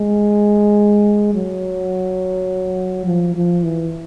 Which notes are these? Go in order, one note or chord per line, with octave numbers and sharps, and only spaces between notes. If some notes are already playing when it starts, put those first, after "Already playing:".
Already playing: G#3
F#3
F3
F3
E3